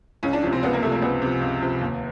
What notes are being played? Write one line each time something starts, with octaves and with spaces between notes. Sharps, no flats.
C#2 C#4
D4
C3 F3 C#4
C4
C#2 B3
A#3
C3 F3 A3
A#3
C#2 B3
C3 F3
C#2
C3 F3
D#2